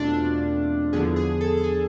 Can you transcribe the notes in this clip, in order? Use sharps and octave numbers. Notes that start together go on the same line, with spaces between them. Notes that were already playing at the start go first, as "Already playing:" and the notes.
Already playing: E2 B2 A3 C4 D4 F4
E2 D3 F3 B3 G#4
G#4
A4
A4
G#4